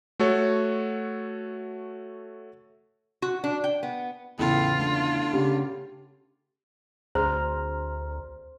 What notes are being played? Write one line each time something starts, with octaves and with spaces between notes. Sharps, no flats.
A3 F#4 A4 C#5
F#4
D4
G5
B3
E2 A2 C#3 B3 F4
D3 A3
C#3 C#4 G4
D2 G#4 C5 A#5 F6